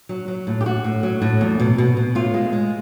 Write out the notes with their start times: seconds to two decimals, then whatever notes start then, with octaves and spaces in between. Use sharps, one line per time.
0.09 F#3
0.28 F#3
0.47 A2
0.61 G4
0.66 A2 F#4
0.84 A2
1.03 F#3
1.22 A2
1.41 E2
1.60 B2
1.78 B2
1.97 B2
2.15 A2 F4
2.34 G#3
2.53 G#3